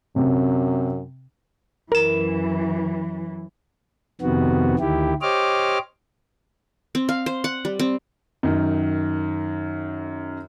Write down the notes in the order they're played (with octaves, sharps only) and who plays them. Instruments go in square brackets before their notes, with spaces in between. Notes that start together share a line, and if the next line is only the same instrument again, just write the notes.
[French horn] F#2 [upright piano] C3
[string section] F#2 E3 [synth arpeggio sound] A#4 E7
[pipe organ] F2 C3 D#3 B3 F#4
D2 D#3 E4 G4
G4 C5 C#5 D#5 D6 F6
[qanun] C4
F5
C5
F#5
G3
C4
[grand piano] F#2 D#3